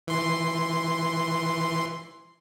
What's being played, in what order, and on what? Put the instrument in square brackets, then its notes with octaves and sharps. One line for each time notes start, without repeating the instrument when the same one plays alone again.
[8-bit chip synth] E3 C6